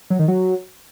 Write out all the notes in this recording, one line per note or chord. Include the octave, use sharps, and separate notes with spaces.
F#3
D#3
F#3